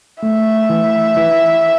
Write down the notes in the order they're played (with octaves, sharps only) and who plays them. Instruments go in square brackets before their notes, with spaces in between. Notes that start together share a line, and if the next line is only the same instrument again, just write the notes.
[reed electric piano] A3 [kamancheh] E5
[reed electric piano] E3
E3